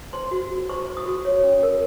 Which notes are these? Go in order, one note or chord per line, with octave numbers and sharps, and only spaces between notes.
C5 C6
F#4
F#4
C5 C#6
C5
D#6
F#4
C#5
C#4
A#4